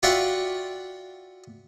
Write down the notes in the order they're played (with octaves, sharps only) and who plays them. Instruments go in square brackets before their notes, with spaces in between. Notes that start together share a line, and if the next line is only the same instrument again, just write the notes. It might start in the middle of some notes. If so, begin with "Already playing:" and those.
[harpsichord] F4 F#4 D5 E5 F#5 G5